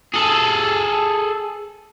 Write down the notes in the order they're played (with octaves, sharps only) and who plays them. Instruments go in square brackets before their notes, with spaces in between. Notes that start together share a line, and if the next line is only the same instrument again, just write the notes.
[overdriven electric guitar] G#4 A4